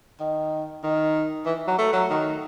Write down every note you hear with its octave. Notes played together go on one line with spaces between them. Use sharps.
D#3
D#3
E3
F#3
A3
F#3
D#3